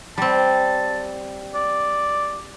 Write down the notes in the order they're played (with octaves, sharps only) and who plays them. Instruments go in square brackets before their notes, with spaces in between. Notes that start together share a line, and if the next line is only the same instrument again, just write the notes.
[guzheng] G3 C4 [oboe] A5
[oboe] D5